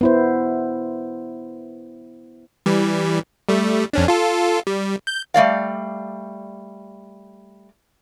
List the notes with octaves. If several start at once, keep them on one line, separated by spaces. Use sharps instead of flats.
B3 E4 C5
E3 G3
G3 A3
F2 C#4 D4
F4 A4
G3
G6
G3 A3 D5 F5